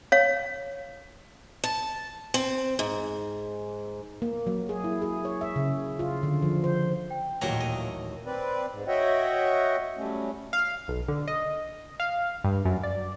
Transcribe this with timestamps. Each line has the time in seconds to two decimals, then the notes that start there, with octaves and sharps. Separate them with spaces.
0.12 C#5 F5
1.64 A5
2.34 C4
2.79 G#2
4.22 A#3
4.47 F#3
4.69 G#4
4.84 E4
5.02 G#4
5.25 C#5
5.41 E5
5.56 C#3
5.99 F4
6.23 D3
6.42 F3
6.64 C5
7.10 G5
7.41 A1 D#2 A#2 F#3 G4 A#5 C#7
7.60 D#5
8.26 C4 B4 D5
8.71 G#2
8.88 F#4 C#5 D#5 E5 F#5 G5
9.98 F#3 G3 A3 C#4
10.53 F5
10.88 B1
11.08 D3
11.28 D#5
12.00 F5
12.44 G2
12.65 F#2
12.83 D5